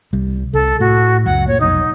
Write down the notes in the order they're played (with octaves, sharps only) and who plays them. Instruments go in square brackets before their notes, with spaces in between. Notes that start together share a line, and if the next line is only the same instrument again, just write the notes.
[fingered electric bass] C2 G3
[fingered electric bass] C2 [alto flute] A4
[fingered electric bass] A2 [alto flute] F#4
[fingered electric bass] C#2 F#2 F#3 [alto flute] F#5
[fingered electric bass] A#2 [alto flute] C#5
[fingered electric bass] F1 B1 [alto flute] D#4